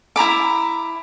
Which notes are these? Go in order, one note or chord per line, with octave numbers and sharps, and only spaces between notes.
E4 A#5 B5 D6